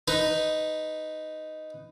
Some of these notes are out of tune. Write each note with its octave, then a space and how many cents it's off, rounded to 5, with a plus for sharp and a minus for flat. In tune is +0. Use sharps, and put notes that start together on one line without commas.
D#4 +0 B4 +10